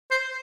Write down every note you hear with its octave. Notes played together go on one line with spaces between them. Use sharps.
C5